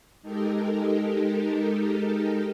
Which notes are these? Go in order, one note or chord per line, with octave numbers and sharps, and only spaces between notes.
G#3 D#4 G4 A4 A#4